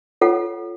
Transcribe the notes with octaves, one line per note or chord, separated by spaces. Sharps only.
F4 A4 C#5 F#5